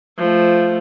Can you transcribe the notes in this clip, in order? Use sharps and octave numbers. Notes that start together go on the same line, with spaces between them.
F3 A3